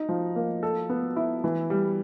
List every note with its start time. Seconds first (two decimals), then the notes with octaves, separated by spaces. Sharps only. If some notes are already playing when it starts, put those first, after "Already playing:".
Already playing: D#4
0.09 F3
0.36 A#3
0.63 A4
0.89 B3
1.16 E4
1.44 E3
1.70 G3